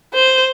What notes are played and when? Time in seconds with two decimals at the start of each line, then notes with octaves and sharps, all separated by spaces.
0.14 C5